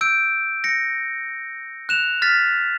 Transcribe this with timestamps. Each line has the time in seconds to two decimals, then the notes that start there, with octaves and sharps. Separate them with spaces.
0.01 E6 G6 D7
0.64 A#6 C#7
1.89 F#6 E7 F7
2.22 F6 A6 B6